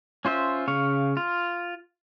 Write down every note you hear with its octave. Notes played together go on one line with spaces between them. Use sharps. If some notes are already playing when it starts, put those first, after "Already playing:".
C#4 F4 C5 E5
C#3 F5 C#6
F4